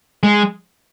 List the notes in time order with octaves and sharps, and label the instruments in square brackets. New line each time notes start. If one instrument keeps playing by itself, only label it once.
[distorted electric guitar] G#3